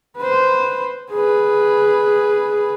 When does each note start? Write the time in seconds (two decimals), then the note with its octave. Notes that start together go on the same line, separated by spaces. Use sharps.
0.17 B4 C5
1.11 G#4 B4